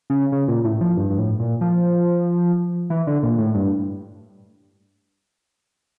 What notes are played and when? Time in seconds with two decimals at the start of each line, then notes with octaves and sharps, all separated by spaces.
0.10 C#3
0.32 C#3
0.48 A#2
0.64 A2
0.81 F3
0.97 G2
1.10 G2
1.19 A2
1.40 A#2
1.61 F3
2.90 E3
3.07 D3
3.23 A#2
3.38 A2
3.54 G2